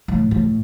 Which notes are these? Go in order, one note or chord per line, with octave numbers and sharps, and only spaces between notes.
A2
A2